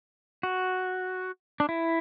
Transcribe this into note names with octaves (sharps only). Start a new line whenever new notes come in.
F#4
D4
E4